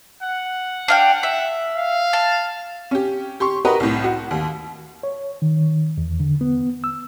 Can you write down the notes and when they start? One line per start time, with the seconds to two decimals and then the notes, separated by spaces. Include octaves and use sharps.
0.23 F#5
0.88 D4 F5 G5
1.23 E5
1.76 F5
2.13 A5
2.91 C#4 G4
3.40 G4 C6 C#6
3.65 F#4 G4 A#4 B4 D#5 A#5
3.80 C2 A2
4.04 F#4
4.31 D#2
5.03 C#5
5.42 D#3
5.98 E2
6.20 D3
6.41 B3
6.84 E6